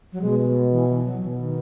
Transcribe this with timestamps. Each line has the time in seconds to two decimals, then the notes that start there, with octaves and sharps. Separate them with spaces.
0.12 F#3
0.21 B2 G#3
0.39 G#3
0.71 E3
0.89 E3
1.05 F#3
1.21 B2 E3
1.38 D#3